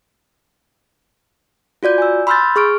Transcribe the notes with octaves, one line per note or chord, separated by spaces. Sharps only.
F4 F#4 D5 G6
G#5 E6
B5 C6 E6 F6 G6 A6
G#4 C#6 F6 D7